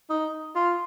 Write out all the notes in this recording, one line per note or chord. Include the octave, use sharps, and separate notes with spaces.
D#4
F4